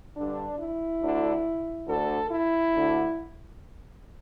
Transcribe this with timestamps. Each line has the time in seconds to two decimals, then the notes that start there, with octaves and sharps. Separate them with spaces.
0.16 G2 D3 D4
0.59 E4
1.01 D2 D3
1.88 D2 D3 A4
2.31 E4
2.74 D2 D3